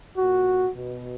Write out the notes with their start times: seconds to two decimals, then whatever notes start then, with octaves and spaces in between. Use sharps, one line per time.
0.17 A#2 F#4
0.76 B2